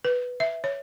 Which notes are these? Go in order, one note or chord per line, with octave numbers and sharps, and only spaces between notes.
B4
E5
C#5